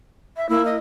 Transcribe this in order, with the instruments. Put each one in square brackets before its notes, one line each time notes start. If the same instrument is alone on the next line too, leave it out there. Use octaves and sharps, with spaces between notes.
[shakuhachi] E5
[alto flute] A#3 [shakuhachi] E4
[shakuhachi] D#5